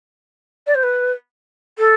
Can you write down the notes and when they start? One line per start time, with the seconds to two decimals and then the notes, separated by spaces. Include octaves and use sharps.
0.66 D5
0.74 C5
0.83 B4
1.78 A4